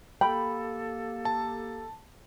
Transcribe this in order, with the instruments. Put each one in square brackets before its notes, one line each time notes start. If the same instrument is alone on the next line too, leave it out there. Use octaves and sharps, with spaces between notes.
[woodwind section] A#3 G4 A4 [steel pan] G5 [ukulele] B5
[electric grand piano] A5